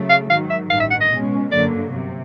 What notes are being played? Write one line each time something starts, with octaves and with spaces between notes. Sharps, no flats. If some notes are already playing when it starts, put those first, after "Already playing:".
Already playing: C#3 F#3 A3
F5
G#2 D#3 F#3 F5
E5
A1 G2 D#3 F5
E5
F#5
D#5
B2 G#3 C#4
G1 F#2 D3 F#3 A#3 D5
C3